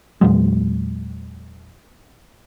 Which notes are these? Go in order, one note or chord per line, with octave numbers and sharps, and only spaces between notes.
E2 A#2 F#3 G#3